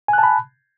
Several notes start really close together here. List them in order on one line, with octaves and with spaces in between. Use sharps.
G#5 F#6 A5 B5